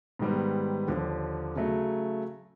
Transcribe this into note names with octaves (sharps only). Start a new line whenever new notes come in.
G#2 D#3 G3 B3
D#2 D3 F3
C#3 F#3 A3